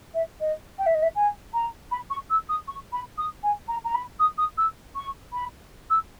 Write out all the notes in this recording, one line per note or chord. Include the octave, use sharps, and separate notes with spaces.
E5
D#5
G5
E5
D#5
E5
G#5
A#5
B5
C#6
E6
D#6
C#6
B5
D#6
G#5
A#5
A#5
B5
D#6
D#6
E6
C#6
B5
E6